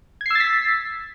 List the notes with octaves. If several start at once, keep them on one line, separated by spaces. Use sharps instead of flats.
E6 G#6 A6 B6 C7